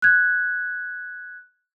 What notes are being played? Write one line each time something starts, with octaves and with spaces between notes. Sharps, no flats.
F#6 G#6